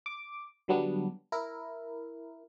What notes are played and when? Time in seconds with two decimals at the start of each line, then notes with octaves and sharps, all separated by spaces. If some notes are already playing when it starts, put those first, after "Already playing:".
0.06 D6
0.68 D3 F#3 G3 B3 D4
1.32 E4 A#4